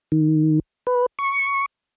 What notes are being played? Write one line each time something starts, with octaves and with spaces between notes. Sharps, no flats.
D#3
B4
C#6